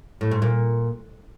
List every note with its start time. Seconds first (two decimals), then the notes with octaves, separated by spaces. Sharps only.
0.21 A2
0.31 G#2
0.42 A#2